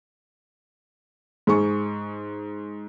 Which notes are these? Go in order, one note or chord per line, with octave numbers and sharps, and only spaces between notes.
G#2 G#4 C#6